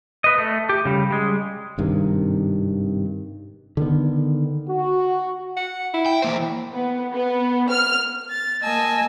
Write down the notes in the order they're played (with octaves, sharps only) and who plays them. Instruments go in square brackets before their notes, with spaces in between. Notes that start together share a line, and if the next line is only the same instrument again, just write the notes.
[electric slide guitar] B4 D#5
A3
G4
C#3 G3
G3 G#3
[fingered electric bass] G#1 G2 C3 D#3
D3 D#3 B3
[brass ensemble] F#4
[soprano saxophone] F#5
E4
[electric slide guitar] G5
E3 A#3 C5
[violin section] B3
B3
F6
[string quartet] A6
A#3 D#5 G#5 A5 E6